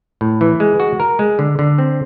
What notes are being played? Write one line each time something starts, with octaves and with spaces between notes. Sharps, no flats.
A2
E3
G#3
F#4
A#4
G#3
D3
D3
C4